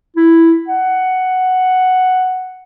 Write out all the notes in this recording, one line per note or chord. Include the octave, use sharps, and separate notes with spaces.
E4
F#5